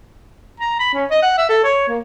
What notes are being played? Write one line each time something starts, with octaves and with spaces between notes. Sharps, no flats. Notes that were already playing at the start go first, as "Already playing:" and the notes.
A#5
B5
C#4
D#5
F#5
E5
A4
C#5
A#3